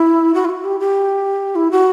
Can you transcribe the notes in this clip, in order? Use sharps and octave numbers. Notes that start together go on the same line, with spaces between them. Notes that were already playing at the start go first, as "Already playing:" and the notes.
Already playing: E4
F#4
E4
F#4
G4
G4
E4
F#4